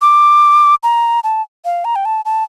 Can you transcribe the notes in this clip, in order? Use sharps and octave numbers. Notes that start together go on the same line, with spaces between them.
D6
A#5
A5
F5
A#5
G5
A5
A5